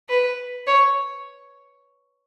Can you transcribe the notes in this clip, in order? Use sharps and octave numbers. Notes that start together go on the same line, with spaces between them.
B4
C#5